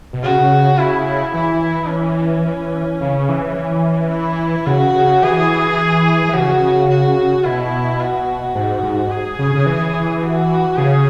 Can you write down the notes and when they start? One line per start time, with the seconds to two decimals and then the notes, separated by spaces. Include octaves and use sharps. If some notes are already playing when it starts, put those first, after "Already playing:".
0.13 B2
0.23 C#3 F#4
0.78 E4
1.34 E3 E4
1.90 C#4
3.01 C#3
3.29 E3
3.56 E3
4.11 E4
4.66 C#3 F#4
4.95 C#3
5.22 E3 G#4
6.29 E3
6.33 C#3 F#4
6.89 F#4
7.44 B2 E4
8.00 F#4
8.55 G#2
8.83 G#2
9.10 G#4
9.39 C#3
9.55 C#3
9.66 E3
10.22 F#4
10.77 C#3 G#4